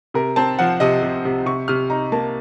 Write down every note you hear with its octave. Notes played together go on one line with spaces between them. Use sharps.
C3 A#4
C4 A5
F3 F#5
C3 D#5
C3
C3
C3 C#6
C3 F6
D#4 A#5
A#3 A5